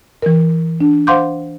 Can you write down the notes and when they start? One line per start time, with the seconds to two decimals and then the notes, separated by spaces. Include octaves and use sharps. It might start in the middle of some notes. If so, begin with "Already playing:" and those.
0.22 E3 A#4
0.81 D4
1.07 C5 F5 F#5 C6 D6 G6